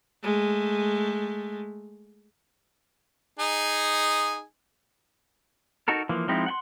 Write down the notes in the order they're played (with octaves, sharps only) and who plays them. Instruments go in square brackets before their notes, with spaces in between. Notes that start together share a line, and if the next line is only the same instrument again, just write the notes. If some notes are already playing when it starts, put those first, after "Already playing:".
[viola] G#3 A3
[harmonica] D#4 G#4 G#5
[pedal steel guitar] D#4 F#4 A4 A#4
E3 F3 A#3
F3 G#3 C4 D#4 E4
F#5 G5 C6